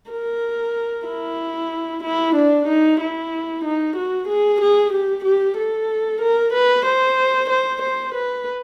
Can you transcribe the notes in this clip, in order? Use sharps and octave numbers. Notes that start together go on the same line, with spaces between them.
A#4
E4
E4
D4
D#4
E4
D#4
F#4
G#4
G#4
G4
G4
A4
A#4
B4
C5
C5
C5
B4